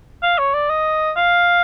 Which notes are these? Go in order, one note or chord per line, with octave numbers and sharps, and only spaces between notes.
F5
C#5
D5
D#5
F5